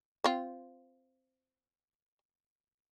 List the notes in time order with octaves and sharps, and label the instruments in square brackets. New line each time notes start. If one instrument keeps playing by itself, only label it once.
[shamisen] C4 F4